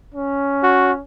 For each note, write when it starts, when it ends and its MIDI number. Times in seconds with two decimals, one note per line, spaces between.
0.14 1.01 61
0.63 0.92 66